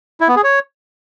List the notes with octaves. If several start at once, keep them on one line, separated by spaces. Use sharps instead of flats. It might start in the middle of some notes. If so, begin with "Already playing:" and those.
E4
B3
G#4
C#5